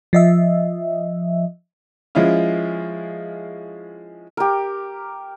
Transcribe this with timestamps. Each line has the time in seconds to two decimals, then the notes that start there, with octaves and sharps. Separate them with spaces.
0.13 F3 D#5 E5
2.15 F3 G#3 C#4 E4 F4
4.37 G4 A#4